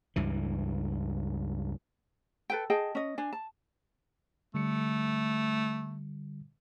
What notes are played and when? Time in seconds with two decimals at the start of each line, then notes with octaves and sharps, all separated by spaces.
0.16 C#2 G2 E3
2.50 A4 B4 G5
2.70 G#4 D#5 G5 A5
2.95 C#4 D#5
3.18 D4 G#5
3.33 A5
4.54 D3 G3 A3 C#7